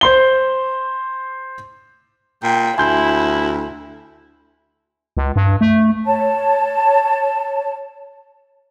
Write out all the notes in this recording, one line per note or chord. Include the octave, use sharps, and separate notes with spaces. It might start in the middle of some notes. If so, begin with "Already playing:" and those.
C5 C6 G7
A#2 G5
D2 E4 G#5 C6 G6
C#2
G2
A3
C#5 A5